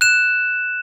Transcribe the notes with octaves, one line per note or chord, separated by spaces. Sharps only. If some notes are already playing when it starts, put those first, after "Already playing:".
F#6 E7